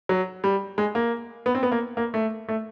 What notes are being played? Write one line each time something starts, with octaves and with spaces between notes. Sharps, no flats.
F#3
G3
G#3
A#3
B3
C4
B3
A#3
A#3
A3
A3